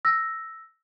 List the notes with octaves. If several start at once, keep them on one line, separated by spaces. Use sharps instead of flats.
E6 A#6